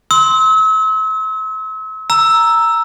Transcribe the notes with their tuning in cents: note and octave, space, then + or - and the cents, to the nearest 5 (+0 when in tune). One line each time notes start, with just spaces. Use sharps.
C6 +0 E6 -40
A#5 +0 E6 +0